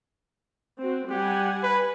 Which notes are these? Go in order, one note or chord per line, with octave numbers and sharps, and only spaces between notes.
C4 F#4
G3 G4 F#5 G#5
B4